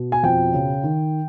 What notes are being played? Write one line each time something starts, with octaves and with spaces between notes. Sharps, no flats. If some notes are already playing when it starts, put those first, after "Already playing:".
Already playing: B2
G#5
F2 G5
C#3
D#3